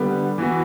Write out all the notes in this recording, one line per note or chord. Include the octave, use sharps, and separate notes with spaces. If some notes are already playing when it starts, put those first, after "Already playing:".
Already playing: D3 G3 B3
E3 B3 F#4